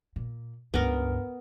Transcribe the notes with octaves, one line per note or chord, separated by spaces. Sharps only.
A#2
C#2 G2 B3 A#4